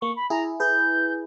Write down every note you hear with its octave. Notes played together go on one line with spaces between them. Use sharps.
A#3 C#6
B5
E4 G#4 A#5
G#4 B4 G6